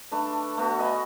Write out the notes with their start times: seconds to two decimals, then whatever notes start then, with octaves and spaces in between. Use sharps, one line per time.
0.12 A3 D4 B4
0.30 D6
0.57 A3 B3 F#4
0.79 D#5 G#5 B5